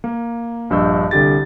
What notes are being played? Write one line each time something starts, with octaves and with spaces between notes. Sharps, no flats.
A#3
A#1 G2 D#5 E6 G6
C2 D3 G4 A6